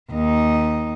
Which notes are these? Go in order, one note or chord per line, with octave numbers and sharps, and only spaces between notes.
D#2 D#4